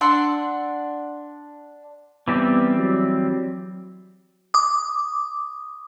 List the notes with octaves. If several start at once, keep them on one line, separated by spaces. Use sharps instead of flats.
D4 F#5 C6 E6
E3 G3 B3 C4
F#3
D6 D#6